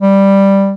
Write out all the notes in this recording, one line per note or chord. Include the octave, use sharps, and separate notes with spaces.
G3